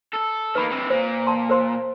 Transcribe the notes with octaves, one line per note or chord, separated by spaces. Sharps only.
A4
D#3 A#3 B4 B5
C3 E3
A#2 C5
A5 C6
A#4 C5 C6